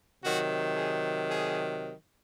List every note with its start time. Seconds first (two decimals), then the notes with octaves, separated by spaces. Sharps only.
0.23 C3 D#3 F#3 F#4
0.75 G#4
1.29 G#4